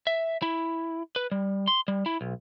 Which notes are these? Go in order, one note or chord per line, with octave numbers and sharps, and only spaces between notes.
E5
E4
B4
G3
C6
G3
E4
B1